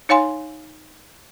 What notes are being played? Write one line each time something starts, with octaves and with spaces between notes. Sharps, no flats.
D#4 C#5 F5 G#5 C6